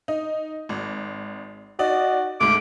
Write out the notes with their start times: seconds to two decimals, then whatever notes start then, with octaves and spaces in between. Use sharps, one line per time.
0.08 D#4
0.69 G#1
1.79 D#4 F#4 D5 D#5
2.41 D2 G#2 D6